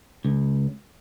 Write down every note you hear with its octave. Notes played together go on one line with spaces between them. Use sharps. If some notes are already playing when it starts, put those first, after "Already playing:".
C#2